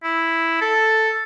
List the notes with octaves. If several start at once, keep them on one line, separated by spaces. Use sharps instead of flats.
E4
A4